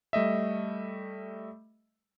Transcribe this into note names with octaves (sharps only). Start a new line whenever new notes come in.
G3 A3 D#5 E5